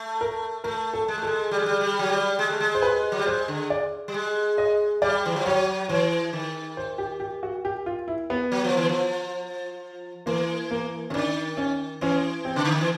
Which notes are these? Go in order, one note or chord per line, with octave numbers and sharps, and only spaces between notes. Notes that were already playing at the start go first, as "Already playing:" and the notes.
Already playing: A3
A#4
A3 A#4
A4
G#3
A3
G#3 A4
G3
G#3
G3
G3
F#3
G3
G#3
A3
G#3
C5
B4
F#3
G3
G#3 C5
D3
D5
G3
G#3
D#5
G3 D5
E3
F3
F#3 C#5
E3 C#5
D#3
C5
G4
G4
F#4
G4
F4
E4
B3
F#3
F3
E3
F3
E3 A#3
A#3
D3 C#4
D#3 D4
C#4
E3 C#4
C4
C#3
D3
D#3
E3